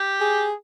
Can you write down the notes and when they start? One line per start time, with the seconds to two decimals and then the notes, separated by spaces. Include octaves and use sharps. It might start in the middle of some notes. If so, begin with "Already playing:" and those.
Already playing: G4
0.21 G#4